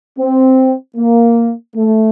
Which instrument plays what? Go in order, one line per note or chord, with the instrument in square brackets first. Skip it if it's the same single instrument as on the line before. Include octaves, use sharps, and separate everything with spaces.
[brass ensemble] C4
A#3
A3